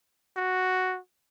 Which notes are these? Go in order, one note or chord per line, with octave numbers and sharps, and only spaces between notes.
F#4